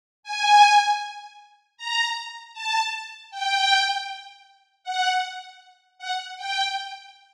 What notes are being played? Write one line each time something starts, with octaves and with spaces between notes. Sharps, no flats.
G#5
A#5
A5
G5
F#5
F#5
G5